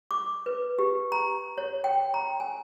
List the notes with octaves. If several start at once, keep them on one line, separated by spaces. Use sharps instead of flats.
D6
B4
G4
A#5
C#5
G5
A#5
G#5